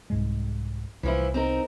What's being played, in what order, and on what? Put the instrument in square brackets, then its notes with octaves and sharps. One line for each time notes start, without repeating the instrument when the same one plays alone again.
[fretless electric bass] C2 G#2 G#3
[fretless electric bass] C2 [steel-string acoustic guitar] E3 F3 E4
[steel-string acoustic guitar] C4 D#4 A#4